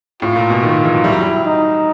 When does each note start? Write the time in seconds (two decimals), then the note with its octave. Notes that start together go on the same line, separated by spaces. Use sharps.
0.22 A2 F4
0.36 A#2
0.50 B2
0.63 D#3
0.84 E3
0.94 F#3
1.04 G3 E4
1.12 F#3
1.21 G3
1.45 D#4